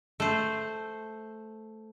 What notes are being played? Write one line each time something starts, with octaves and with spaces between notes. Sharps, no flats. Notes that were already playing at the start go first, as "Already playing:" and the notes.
A3 C5